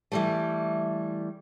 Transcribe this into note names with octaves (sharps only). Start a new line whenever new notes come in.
E3 G3 A3